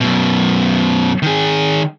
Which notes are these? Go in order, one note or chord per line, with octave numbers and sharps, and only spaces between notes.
F#2 B2
D#3 G#4